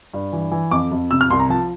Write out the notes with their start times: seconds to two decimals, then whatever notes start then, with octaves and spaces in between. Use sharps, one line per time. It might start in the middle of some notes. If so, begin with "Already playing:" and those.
0.14 G2
0.33 E3
0.51 E3
0.71 F2 D6
0.92 F2
1.11 C3 E6
1.21 F6
1.30 C2 C6
1.40 A#5
1.49 F3 A5